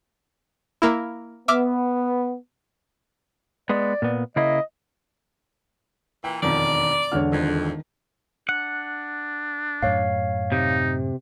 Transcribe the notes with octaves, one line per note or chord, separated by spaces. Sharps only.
A#3 E4
B3 E5 D6 F6
G#3 B3 D5
A#2 B3
C#3 A#3 E4 D#5
A#2 E3 G5
E1 F2 D#3 D5
E1 D3 C#5 F#5 F6
F2 D#3
D4 F#5
F#2 A2 C#5 F5
C3 D#4